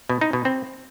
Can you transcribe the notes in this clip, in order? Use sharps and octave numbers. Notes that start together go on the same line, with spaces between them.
B2
D#4
B2
C4